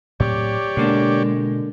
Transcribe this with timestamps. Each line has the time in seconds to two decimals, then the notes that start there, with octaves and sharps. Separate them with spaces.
0.20 A2 F#3 C4 G4 C#5 D5
0.77 B2 D3 G#3 A#3 D4